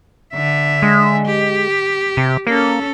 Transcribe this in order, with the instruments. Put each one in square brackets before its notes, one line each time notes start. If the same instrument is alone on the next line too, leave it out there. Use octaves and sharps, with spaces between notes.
[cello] D3 E5
[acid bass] G#3
[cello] G4
[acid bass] C3
[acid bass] A#3 [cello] C#4 A4